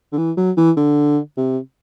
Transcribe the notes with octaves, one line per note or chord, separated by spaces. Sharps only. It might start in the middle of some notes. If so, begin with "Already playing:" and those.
D3
E3
F#3
E3
D3
C3